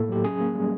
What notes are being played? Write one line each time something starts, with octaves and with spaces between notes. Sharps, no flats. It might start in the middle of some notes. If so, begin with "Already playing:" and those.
Already playing: A2 A#3 A4
F#3 G4
C#4 G#4
A#3
G3